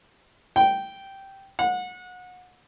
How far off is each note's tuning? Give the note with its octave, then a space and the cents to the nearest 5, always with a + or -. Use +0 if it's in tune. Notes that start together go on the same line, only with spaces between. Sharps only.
G5 -10
F#5 -30